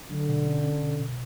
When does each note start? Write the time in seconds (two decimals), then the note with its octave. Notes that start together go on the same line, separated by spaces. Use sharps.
0.11 D3 F#3
0.28 B2
0.46 C#4
0.64 C#4
0.82 B2
1.00 B2